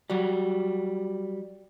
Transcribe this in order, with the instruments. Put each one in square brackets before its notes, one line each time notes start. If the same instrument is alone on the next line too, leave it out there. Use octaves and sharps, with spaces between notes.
[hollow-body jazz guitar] F#3 G3